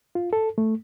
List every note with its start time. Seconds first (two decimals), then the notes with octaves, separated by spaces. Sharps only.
0.15 F4
0.33 A4
0.58 A3